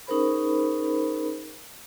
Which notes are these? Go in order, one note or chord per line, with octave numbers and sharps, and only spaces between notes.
C#4 D#4 G#4 A#4 C5 B5